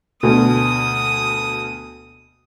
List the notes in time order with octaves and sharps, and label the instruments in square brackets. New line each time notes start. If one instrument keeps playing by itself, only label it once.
[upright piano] D2 B2 [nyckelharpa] D#6